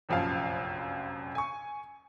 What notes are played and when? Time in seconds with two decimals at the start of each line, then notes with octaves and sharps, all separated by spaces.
0.09 F1 A#1 F#2 F3 F5
1.35 G#5 C#6